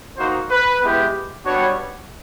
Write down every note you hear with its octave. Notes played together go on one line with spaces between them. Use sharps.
A#3 D#4 F#4 C5
B4
G#3 B3 E4 G4
G3 B3 D4 F#4 C#5